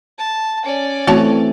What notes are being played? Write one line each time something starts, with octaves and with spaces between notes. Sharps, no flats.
A5
C#4 D5
E3 A3 C4 F#4 C#5 A5